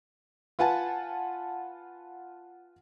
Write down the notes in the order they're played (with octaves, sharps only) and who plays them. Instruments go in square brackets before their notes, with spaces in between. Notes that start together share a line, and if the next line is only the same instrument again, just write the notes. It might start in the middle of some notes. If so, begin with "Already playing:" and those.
[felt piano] F4 B4 F#5 G#5 A5